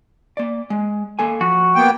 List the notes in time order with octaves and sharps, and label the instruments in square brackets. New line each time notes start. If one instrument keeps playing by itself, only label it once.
[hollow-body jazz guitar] A#3 D5
G#3
A#3 A4 G#5
[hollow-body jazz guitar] F3 [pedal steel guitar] F#4
[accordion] A#3 B3 G5